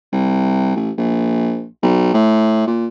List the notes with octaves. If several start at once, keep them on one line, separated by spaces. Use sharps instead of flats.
C2
A1
A#1
B1
A2
A#2